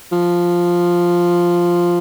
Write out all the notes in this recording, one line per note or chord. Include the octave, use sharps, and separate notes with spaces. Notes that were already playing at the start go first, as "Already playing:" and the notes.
F3